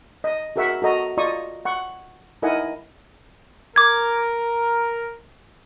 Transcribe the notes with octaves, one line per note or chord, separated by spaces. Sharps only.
D#5
F#4 G#4 A#4 E5 F#5 C#6
F#4 A4 D#5 A#5
F4 D5 D#5 A#5 C#6 D#6
F#5 C#6
D#4 E4 A#4 D#5 F#5 G#5
A#4 D6 G#6